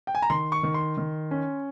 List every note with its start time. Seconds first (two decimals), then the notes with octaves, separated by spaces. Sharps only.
0.07 G5
0.15 G#5
0.22 A#5
0.30 D#3 C6
0.52 C#6
0.63 D#3
0.74 C6
0.97 D#3
1.31 C#4